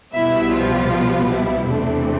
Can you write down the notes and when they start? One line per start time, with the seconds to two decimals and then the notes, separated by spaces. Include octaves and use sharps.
0.13 C2 B2 G3 B3 E4 E5
0.52 F3 F4
1.30 E4
1.68 E2 C3 E3 A3 C4 D4